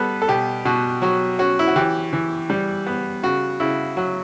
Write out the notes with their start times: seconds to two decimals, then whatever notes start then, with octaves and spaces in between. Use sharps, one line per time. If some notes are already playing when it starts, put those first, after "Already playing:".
Already playing: G3 B3 A4 B4
0.22 A4
0.28 B2 G4
0.65 B2 F#4
1.02 F#3 F#4
1.39 C#4 F#4
1.59 E4
1.67 F#4
1.76 E3 G4
2.13 E3
2.50 G3
2.87 B3
3.23 C#3 F#4
3.60 C#3 E4
3.97 F#3 F#4